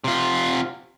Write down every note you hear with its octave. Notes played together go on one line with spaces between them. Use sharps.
C3 F4